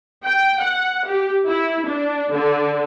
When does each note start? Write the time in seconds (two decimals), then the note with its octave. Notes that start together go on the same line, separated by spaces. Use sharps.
0.24 G5
0.60 F#5
1.07 G4
1.47 E4
1.86 D4
2.33 D3